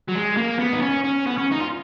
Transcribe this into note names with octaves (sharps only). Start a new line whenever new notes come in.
F#3
G#3
A#3
B3
D#4
C#4
C#4
B3
C#4
D#4
F4